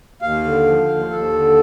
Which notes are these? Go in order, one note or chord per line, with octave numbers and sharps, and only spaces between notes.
D#2 F5
D3
F3
D#2
D#2 A4
D3